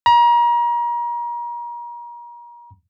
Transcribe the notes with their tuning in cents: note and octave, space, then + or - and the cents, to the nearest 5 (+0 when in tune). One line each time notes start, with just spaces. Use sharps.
A#5 +35